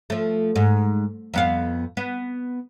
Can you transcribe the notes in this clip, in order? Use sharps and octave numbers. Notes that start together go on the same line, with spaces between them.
F3 A3
G#2
F2 B3 F5
B3